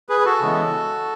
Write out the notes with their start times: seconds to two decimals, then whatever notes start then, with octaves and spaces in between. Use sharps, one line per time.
0.09 G#4 B4
0.20 B4
0.26 F#4 A4
0.41 C#3 E3 G#3 B3